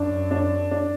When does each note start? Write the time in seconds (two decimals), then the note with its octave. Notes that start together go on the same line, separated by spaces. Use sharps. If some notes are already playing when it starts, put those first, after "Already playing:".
Already playing: F#2 D4
0.31 D4
0.71 D4